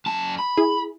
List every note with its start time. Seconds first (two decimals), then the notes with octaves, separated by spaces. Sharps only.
0.06 F#2 A5
0.39 B5
0.57 E4 G#4